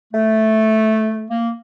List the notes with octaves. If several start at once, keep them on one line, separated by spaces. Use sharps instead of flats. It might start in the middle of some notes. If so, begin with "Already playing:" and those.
A3
A#3